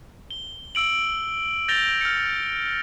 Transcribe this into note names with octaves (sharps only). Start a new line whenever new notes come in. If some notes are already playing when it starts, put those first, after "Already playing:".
G7
E6 D7 F#7
G6 A6 A#6 D7 F7 G7
F6 C#7